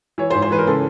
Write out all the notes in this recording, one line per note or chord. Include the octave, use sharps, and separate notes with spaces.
E3 C#5
C5
G#2
C5
E3 B4
A#4
C#3 A4